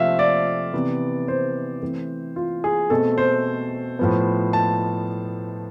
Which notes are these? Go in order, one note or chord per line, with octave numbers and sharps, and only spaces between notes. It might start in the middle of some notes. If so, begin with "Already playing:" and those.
Already playing: C3 F3 A3 C4 E5 F5
D5
C3 E3 B3
C5
E3 A3 C4
F4
G#4
B2 A3 C4 A4
C5
A2 F3 B3
A5